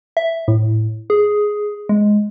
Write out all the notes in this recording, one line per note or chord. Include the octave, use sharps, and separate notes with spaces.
E5
A2
G#4
G#3